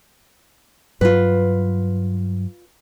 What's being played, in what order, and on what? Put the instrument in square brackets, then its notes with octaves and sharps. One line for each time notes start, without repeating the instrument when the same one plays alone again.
[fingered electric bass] G2 F#3 [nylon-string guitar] F4 B4